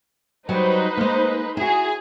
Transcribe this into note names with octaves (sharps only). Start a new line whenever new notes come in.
F#3 G3 D#4 B4 C5
G#3 A#3
E4 F#4 G#4